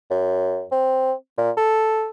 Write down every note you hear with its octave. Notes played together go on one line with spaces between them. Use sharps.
F#2
C4
A#2
A4